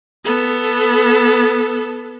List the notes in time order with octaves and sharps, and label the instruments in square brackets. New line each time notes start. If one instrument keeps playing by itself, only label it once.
[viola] B3 A4